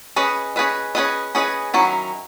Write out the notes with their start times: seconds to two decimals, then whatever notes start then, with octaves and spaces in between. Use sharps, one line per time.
0.16 C#4 G#4 B4 D#5
0.56 C#4 G#4 B4 D#5
0.95 C#4 G#4 B4 D#5
1.35 C#4 G#4 B4 D#5
1.74 D#3 F#3 C#4 E4